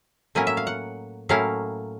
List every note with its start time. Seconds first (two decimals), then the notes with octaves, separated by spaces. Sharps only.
0.35 A2 F#3 A#3 C#4 E4 G#5
0.47 E5
0.57 F5
0.67 F#5
1.29 A2 F#3 A#3 C#4 E4 F5